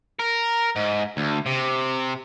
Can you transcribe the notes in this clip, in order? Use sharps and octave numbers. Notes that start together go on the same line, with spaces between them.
A#4
G#2
D2
C3